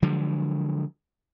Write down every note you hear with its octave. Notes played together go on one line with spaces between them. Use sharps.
D3 F3 F#3 G#3